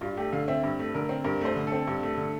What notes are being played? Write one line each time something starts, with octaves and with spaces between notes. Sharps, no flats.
G2 F4
A3 G4
D3 F5
C4 E5
G2
A3
D3 A#4
C4
G2 A#4
A3 C5
D3
A4
C4
G2
A3
D3